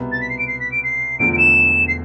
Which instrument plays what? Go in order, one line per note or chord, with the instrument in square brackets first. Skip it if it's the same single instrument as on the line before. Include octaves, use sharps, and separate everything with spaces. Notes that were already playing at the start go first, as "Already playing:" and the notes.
Already playing: [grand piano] C2 B2 B3
[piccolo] A6
B6
C7
D7
C7
B6
D7
C7
[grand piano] E1 E2 D3 F3 A3 [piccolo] D7
[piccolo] D7
E7
C7